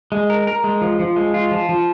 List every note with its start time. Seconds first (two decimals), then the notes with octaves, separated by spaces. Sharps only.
0.12 G#3
0.30 A#4
0.47 A#4
0.64 G#3
0.81 F3
0.99 F3
1.16 G#3
1.34 F4
1.51 F3
1.69 F3